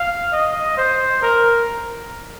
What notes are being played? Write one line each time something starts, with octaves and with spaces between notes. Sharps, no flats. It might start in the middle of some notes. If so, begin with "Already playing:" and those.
Already playing: F5
D#5
C5
A#4